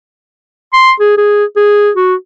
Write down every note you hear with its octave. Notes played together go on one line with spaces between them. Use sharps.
C6
G#4
G#4
G#4
F#4